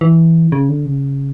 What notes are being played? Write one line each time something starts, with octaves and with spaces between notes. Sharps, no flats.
E3
C#3
D3
C#3